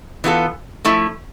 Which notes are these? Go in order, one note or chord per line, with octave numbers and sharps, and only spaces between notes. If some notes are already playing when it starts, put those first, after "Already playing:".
E3 B3 F4 A4
F3 A3 E4